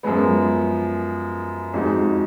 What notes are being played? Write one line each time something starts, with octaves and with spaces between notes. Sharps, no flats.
F#2 F3 G#3 B3
F2 F3 G#3 D#4 F#4